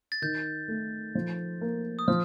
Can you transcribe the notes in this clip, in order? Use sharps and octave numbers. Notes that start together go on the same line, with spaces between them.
A6
D#3 G6
A3
F3
A#3
D#6
F3 F6